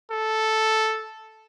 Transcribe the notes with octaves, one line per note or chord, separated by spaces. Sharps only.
A4